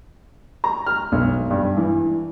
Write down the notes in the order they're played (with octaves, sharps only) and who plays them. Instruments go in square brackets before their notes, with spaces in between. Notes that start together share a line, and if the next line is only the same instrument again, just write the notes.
[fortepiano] A#5
F6
B1
G2
E3